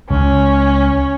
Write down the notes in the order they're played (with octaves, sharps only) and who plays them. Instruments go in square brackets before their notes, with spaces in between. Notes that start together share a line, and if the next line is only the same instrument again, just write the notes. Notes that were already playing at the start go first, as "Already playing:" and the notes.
[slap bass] C#2 [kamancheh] C#4